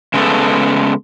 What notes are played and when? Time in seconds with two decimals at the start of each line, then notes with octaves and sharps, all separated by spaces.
0.14 C#3 G#3 A3 B3 A4